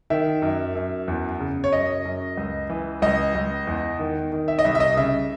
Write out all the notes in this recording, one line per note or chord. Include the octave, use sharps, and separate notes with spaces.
D#3 E5
F#2
F#2
E2
C#3
C#5
F#2 D#5
F#2
C#2
E3
C#2 D#5
C#2
E2
D#3
D#3
E5
D#5
C2 E5
E5
D#5
C#3 E5